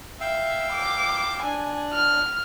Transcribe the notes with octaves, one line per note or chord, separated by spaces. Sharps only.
E5 F5 G5 E6
D6
D4 G#5
F6